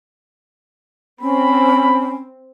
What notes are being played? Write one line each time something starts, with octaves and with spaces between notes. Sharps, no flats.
C4 C#4 B5